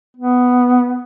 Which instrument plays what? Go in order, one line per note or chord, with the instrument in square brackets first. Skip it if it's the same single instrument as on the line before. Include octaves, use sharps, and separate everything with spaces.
[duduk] B3